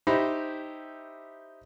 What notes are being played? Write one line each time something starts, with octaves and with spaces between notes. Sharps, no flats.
D#4 E4 G4 C5 B5